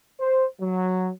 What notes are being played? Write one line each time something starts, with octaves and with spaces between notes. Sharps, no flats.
C5
F#3